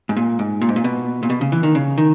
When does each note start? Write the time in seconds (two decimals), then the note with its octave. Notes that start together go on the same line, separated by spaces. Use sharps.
0.09 G#2
0.17 A#2
0.39 G#2
0.62 A#2
0.69 G#2
0.76 A#2
0.84 B2
1.23 A#2
1.30 B2
1.41 C#3
1.52 E3
1.63 D#3
1.75 C#3
1.98 D#3